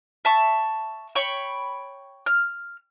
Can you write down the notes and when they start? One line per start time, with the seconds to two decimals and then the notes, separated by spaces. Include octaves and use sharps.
0.25 E5 A5 C#6
1.15 C#5 G5 B5 C#6
2.26 F6